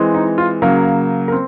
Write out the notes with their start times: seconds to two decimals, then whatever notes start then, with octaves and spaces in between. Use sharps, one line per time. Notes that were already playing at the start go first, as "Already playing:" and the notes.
Already playing: E3 G#3 C4
0.14 D#4
0.38 F4
0.62 C#3 F#3 A#3 A#4
1.28 A#4
1.32 C4